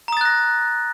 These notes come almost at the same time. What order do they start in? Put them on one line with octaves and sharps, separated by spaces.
A#5 D#6 A6 F#6 A#6